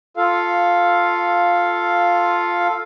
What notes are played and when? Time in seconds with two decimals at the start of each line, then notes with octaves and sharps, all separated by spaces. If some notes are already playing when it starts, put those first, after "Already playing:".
0.17 F4 A4 F5